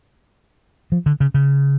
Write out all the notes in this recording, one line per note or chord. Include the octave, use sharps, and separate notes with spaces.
F3
D3
C#3
C#3